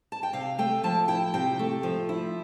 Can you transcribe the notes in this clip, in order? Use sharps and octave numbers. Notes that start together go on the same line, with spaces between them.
A5
G5
C3 F5
A3 G5
F3 A5
E4 G5
C3 G5
A3
F3
E4